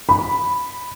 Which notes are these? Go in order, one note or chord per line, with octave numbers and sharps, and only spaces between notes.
B5